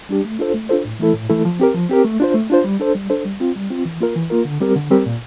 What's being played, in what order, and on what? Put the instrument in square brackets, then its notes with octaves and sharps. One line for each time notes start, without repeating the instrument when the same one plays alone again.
[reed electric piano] G3 D4 G4
A3
D4 F4 A4 C5
A3
D4 F4 A4 C5
A2
E3 A3 E4 A4
A2
E3 A3 E4 A4
F3
C4 G4 A#4
F3
C4 G4 A#4
A3
D4 F4 C5
A3
D4 F4 C5
G3
D4 A4 C5
G3
D4 A4 C5
G3
C4 F4
G3
C4 F4
E3
A#3 F4 A#4
E3
A#3 F4 A#4
D3
G3 C4 G4 A#4
D3
G3 C4 G4 A#4
A#2